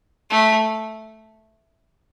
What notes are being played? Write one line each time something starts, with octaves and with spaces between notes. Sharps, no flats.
A3